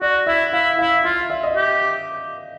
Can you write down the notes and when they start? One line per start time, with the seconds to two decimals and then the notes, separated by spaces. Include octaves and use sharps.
0.01 F#4 D5
0.27 E4 E5
0.52 E4 F5
0.79 E4 F5
1.04 F4 F5
1.30 E5
1.43 D#5
1.56 G4